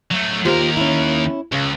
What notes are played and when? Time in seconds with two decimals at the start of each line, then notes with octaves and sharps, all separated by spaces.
0.11 F#3 A3
0.45 D#2 F4 G4 A#4 C5
0.77 C#4 E4
1.52 C#2 C#3